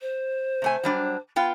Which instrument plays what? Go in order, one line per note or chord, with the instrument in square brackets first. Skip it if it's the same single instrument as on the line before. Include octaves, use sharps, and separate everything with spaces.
[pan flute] C5
[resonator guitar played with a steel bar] C3 A3 G#5
F#3 G3 D4
B3 F4 G5